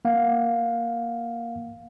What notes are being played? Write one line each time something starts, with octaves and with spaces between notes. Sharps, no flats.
A#3 F5 F#5